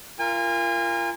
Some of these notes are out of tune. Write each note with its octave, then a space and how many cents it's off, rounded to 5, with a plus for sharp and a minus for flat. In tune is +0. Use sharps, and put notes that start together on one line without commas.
F4 -25 A#4 +0 G#5 -35